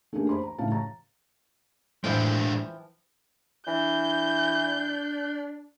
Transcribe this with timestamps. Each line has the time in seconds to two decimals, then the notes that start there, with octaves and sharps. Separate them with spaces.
0.13 A3 A#3 C#4 D4 G4 G#4
0.29 C5 B5 C6
0.43 A#5
0.58 A2 C#3 F5 A5
0.72 A#5 A6
2.04 A2 E3 F3 G#3 D4 G5
3.67 E3 D4 G6